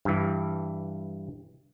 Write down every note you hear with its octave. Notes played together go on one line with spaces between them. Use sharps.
G2 E3